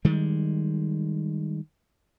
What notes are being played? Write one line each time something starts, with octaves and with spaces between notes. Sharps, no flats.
D#3 G3 G#3